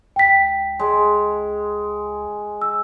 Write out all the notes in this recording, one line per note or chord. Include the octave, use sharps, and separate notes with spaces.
C#2 G5 B6
G#3
E6